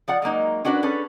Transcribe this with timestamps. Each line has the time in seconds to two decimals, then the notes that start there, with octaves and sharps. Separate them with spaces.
0.08 F3 D5 F#5
0.22 F#3 G#3 A#3 D#4
0.65 C#4 D4 F#4 A#4 B4
0.83 C#4 G#4 A4 B4